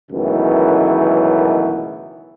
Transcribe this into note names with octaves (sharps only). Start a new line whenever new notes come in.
C#2 F#2 B2 D#3 E3 A3